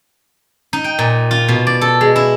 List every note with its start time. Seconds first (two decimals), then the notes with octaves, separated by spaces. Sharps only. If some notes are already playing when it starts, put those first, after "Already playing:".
0.73 D#4
0.84 G5
0.99 A#2
1.31 F4
1.48 B2
1.67 D5
1.81 A4
2.01 G#3
2.16 E4